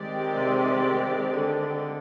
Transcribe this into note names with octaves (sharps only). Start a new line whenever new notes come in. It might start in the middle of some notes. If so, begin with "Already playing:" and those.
Already playing: D#3 G#3 C4 G4 D5
C3
D3